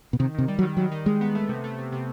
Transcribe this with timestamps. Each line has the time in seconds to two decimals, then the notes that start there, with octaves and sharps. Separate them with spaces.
0.13 B2
0.19 C3 D#3
0.35 C3 D#3
0.48 G3
0.59 F#3
0.63 D#3
0.77 D#3 F#3
0.92 D#3
1.06 D#3 G#3
1.21 B3
1.35 A3
1.49 C3
1.64 A3
1.79 C3
1.92 C3